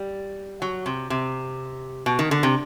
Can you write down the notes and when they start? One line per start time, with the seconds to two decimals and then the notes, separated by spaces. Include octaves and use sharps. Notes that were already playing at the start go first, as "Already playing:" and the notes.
Already playing: G3
0.62 F#3
0.86 C3
1.10 C3
2.06 B2
2.19 D#3
2.31 D3
2.43 C3